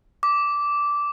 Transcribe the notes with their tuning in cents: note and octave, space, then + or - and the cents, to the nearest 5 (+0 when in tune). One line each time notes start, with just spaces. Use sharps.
D6 -10